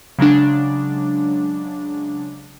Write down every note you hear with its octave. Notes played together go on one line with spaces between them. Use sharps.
C#3 F#3 G#3 D4